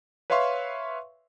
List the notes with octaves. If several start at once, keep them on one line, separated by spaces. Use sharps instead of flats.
B4 C#5 E5 F5 C6 C#6